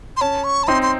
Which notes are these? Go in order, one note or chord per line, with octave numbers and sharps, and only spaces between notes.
C6
C#4 A5
C#6
A5
C4 D#4 C6
C6